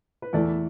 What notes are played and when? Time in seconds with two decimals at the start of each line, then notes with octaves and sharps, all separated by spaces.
0.22 B4
0.33 E2 E3 A3 A4 D5